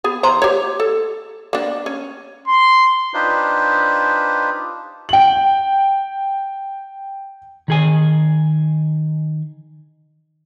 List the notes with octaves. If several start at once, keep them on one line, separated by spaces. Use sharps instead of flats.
B3 G#4
E3 C5 A#5
G4 C#5
A4
A#3 D4
C#4
C6
D4 D#4 F4 G4 B4 C5
G5 F#7
D#3 G#4 G#5